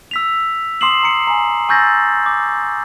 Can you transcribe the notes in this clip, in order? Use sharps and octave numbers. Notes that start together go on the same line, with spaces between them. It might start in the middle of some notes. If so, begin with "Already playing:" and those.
E6 B6 F7
C6 D6 D#6 C7 E7 F#7
A#5 C#7
G#5 A#5
G#5 C#6 E6 G6 A6 A#6
D6